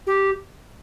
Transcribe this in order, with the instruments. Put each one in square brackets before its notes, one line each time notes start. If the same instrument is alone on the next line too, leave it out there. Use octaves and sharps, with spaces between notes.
[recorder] G4